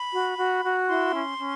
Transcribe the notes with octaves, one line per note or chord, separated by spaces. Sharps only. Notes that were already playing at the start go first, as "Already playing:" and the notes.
Already playing: B5
F#4
F#4
F#4
E4 C6
C#4
C#4